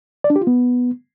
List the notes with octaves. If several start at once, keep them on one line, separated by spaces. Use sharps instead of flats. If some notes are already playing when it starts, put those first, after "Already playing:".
D5
D4
G4
F4
B3